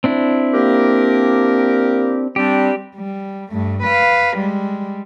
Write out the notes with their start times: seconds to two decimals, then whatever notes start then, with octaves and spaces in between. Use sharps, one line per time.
0.04 C4 D4 E4
0.53 A#3 G4 A#4
2.36 G3 C4 D4 G4
2.96 G3
3.51 G2 A3
3.83 B4 F5
4.37 G3 G#3